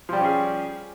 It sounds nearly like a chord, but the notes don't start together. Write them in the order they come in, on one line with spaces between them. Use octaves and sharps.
F3 G3 G4 C#4 G#4